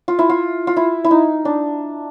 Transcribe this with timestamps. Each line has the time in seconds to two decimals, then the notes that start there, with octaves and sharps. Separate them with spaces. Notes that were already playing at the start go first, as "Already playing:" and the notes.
0.08 F4
0.19 E4
0.29 F4
0.67 F4
0.76 E4
1.04 E4
1.11 D#4
1.45 D4